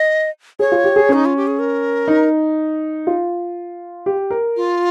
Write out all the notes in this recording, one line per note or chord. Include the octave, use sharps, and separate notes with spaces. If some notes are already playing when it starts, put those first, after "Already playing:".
Already playing: D#5
G#4 C#5
F4
G4
G#4
C#4 D#4
F4
G4
G#4
A#4
D#4
F4
G4
A#4
F4